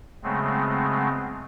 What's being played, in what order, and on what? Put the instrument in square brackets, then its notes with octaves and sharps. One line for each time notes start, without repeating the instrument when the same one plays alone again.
[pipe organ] C#3 F#3 G#3 A3 B3 C4